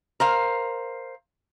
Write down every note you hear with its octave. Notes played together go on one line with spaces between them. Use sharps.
A#4 C5 F5